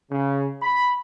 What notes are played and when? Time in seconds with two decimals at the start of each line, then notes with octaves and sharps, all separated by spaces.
0.12 C#3
0.62 B5